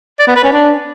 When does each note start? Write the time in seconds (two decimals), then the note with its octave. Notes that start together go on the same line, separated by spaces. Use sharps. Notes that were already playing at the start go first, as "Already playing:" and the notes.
0.19 D5
0.27 B3
0.36 B4
0.44 C#4
0.52 D4